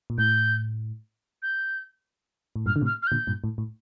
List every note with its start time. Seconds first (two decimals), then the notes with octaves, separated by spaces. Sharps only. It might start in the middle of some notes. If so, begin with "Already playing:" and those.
0.10 A#2
0.18 A2 G6
1.42 G6
2.56 A2
2.66 G2 A#2 F6
2.76 D3
2.81 A2 C3
2.86 F6
3.02 F6
3.07 A#2 D3 G6
3.27 G2 A#2
3.44 A2
3.58 A2